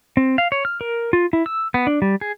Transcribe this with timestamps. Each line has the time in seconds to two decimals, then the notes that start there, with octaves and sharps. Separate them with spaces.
0.17 C4
0.38 F5
0.52 C#5
0.65 F6
0.81 A#4
1.13 F4
1.33 E4
1.46 E6
1.74 B3
1.87 D4
2.02 G3
2.21 G#4